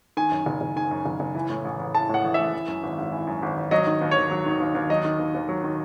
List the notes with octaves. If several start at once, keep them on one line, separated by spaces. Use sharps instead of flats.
D#3 G#5
F#2
F#1
F#1
D#3 G#5
F#2
F#1
F#1
E3
A2
A1
A1
E3 A5
A2 F#5
A1
A1 E5
E3
F#2
G#1
G#1
E3
F#2
G#1
G#1
F#3 D#5
D#3
D#2
C#5
D#2
F#3
D#3
D#2
D#2
F#3 D#5
D#3
D#2
D#2
F#3
D#3